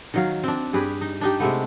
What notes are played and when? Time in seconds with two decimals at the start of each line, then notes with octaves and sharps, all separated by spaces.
0.14 D#3 F#3 F5
0.43 C4 D4
0.73 G2 G4 G#4 B4
1.01 D#4
1.21 D4 D#4 G4
1.40 C3 G#3 A3 B3